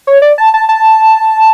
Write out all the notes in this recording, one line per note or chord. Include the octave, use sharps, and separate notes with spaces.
C#5
D5
A5
A5
A5